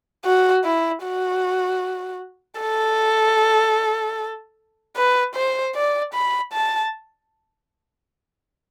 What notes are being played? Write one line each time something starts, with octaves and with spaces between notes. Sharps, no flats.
F#4
E4
F#4
A4
B4
C5
D5
B5
A5